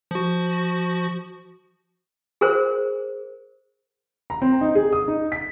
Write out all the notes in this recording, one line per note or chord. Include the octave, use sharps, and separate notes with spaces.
F3 F#4
G#4 A#4 C5
A#5
C4
D#4
G#4
D#6
D#4
B6